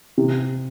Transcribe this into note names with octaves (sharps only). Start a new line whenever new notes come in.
C3